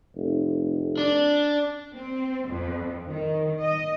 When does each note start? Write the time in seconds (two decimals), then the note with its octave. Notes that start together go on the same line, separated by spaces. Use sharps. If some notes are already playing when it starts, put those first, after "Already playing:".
0.16 F1
0.99 D4
1.94 C4
2.49 F2
3.08 D#3
3.62 D#5